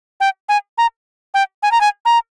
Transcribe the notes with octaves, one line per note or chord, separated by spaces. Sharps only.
G5
G#5
A#5
G5
G#5
A#5
G#5
A#5